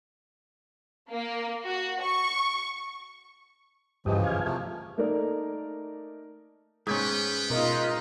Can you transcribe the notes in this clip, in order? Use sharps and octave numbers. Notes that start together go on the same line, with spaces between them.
A#3
F#4
C#6
G2 C#3 E3 F3 G4 D#5
F5 G#5
C3 F3 A3
A3 A#3 D#4 A4 A#4 D5
G#2 B3 C#4 B4 G5
B2 D#4 F4 A#4 D#5